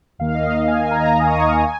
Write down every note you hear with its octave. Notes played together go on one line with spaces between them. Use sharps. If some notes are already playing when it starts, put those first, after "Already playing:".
D#2 D#3 A#3 F5
D#5
F5
F5
G#5
G#5
A#5
D#6
C#6
G#5